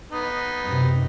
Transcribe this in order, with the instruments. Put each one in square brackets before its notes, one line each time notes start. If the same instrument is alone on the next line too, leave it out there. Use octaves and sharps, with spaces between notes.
[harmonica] B3 D#4
[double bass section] F#2 C3